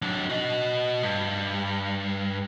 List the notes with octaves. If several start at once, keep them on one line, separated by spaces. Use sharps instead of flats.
F#3 D4
F#4 D#5
G2